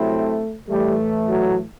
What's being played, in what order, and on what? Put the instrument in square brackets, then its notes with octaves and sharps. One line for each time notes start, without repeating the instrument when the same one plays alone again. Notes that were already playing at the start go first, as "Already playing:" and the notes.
Already playing: [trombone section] C3 F#3 C4 E4 [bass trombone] A3
[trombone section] A2 E3 A3 [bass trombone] G3
[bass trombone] F#3